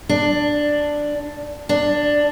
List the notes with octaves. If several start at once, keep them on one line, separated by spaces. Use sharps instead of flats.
D4
D4